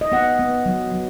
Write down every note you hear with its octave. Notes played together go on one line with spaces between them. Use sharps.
D#5
B3 F#5
B3
F#3
F#3